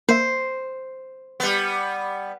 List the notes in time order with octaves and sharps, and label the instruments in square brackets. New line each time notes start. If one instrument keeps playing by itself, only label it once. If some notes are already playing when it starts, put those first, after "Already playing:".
[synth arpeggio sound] A#3 E5 [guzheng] C5
[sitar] G3 B3